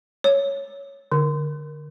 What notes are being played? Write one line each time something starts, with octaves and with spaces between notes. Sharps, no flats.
C#5
D3